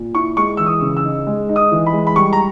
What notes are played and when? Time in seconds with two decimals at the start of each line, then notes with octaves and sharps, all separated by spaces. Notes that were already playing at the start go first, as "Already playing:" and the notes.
Already playing: A#2
0.15 E4 C#6
0.37 G#3 C#6
0.57 E3 E6
0.66 D#6
0.82 C#3
0.97 E6
1.04 D#4
1.27 G#3
1.49 D#4
1.56 D#6
1.72 E3
1.86 B5
1.93 G#3
2.07 B5
2.16 G3 C#6
2.33 A#5